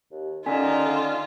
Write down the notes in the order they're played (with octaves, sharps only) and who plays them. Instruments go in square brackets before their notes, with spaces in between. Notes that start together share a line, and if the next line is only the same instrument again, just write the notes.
[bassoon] D#2
[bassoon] D3 [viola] D#3 [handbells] C#4 G#5 B6 [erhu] F4
[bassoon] D3